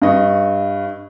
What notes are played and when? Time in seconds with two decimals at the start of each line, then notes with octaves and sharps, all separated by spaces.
0.02 G2 D#5 C#6